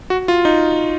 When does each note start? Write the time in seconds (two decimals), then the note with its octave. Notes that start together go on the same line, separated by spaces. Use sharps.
0.10 F#4
0.28 F4
0.45 D#4